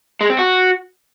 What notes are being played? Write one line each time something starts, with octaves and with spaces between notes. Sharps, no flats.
G#3
C4
F#4